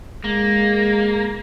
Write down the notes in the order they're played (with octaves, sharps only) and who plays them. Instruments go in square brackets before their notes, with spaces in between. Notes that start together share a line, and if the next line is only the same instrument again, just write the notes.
[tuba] G#3 [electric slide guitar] A#3